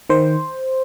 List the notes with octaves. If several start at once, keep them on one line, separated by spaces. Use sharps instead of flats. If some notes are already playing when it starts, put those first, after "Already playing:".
D#3 C5